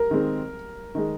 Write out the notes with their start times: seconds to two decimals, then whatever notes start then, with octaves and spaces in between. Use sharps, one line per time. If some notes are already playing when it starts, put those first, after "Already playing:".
Already playing: A#4
0.11 D#3 G#3 C4
0.95 D#3 G#3